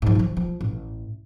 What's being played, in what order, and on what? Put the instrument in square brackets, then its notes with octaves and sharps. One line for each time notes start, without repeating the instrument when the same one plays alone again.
[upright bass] G#2 F3
D#3 F3
F3
A1